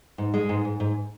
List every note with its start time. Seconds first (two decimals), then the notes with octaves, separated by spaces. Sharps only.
0.18 G#2
0.34 G#3
0.49 G#2
0.65 G#2
0.80 G#2